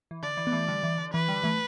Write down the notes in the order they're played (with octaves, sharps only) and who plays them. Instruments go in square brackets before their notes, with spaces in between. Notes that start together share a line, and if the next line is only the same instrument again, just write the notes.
[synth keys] E3
[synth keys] D3 [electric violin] D5
[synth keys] E3
B3
E3 A3
D3 G3
E3
D3
[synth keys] E3 [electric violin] B4
[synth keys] D3 G3
E3 A3